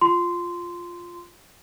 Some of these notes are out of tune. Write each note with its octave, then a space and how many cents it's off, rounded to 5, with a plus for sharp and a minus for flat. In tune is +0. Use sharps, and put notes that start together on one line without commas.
F4 +0 C6 -15